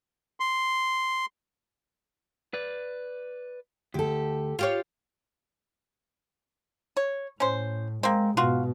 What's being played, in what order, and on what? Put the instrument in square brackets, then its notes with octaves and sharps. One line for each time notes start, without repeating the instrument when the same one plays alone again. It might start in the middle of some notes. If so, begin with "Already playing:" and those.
[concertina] C6
[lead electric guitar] B4 D5
[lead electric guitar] D2 [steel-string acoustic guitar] G4 A4
[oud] F4 G4 C#5
[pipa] C#5
[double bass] A2 [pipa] C#4 C5
[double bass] G#3 [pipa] A#3 C4
[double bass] G#2 B2 [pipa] F4 F#4